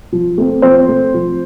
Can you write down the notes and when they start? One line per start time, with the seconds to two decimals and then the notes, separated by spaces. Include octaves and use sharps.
0.12 F3
0.38 A3 C4
0.62 F3 C4 C5
0.88 A3 C4
1.14 F3